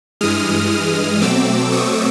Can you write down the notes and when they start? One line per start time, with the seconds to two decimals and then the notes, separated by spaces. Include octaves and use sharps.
0.21 G2 E3 G#3 D#6 F6
0.72 D#6 F6
1.21 B2 F#3 A3 C4 D6 E6
1.72 C#6 D#6